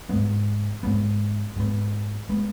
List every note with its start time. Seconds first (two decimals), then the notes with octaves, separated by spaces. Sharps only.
0.09 G#2 G#3 B3
0.83 G#2 G#3 B3
1.56 G#2 G#3 B3
2.29 G#3 B3